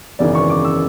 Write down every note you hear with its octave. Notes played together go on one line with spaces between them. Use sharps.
G#1 F#2 C#3 E3 B3 D5
C#6
D6
E6